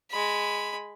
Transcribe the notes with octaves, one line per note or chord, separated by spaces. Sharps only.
G#3 B5